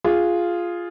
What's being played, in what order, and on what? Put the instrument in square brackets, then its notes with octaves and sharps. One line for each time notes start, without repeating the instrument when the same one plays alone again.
[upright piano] F4 G#4